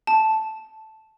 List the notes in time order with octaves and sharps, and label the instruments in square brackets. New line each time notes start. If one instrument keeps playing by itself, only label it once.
[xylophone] A5